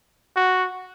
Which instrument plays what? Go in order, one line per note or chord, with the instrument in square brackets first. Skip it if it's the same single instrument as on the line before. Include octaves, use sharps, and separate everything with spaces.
[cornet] F#4